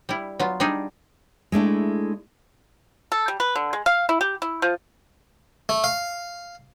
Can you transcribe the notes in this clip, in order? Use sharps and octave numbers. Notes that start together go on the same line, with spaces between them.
G3 E4
F#3 B3 F4
G3 D4 D#4 G#4
G#3 A3 D4 E4
A4
G3
B4
D3
G#3
F5
E4
G4
E4
F3
A3
F5